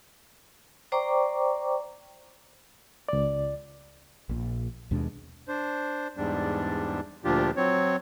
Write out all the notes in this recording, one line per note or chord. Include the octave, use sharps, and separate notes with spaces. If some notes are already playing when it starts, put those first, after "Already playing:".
C5 D5 G5 A#5 C#6 D6
C#2 D5
A#1 A#2
D#2 B2 G#3 D4
D4 C5
E2 G#2 G3 D4
D2 A#2 F3 D4 F4 G4
F#3 C4 C#5